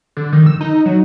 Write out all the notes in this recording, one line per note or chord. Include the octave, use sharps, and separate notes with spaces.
D3
D#3
E6
D#4
F#3